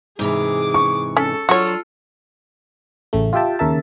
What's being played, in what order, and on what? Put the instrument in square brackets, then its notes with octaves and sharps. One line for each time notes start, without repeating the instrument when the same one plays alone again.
[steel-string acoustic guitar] G#2 C3 E3 [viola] G#4 D6
[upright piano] C#6
[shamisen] C#4 [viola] A4
[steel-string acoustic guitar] F#3 D4 [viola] F4 A4 [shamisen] F#4 C#5
[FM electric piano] A1 C#3 A3
F4 G4 E5 G5 A5
D#2 C#3 A#4 E5 A5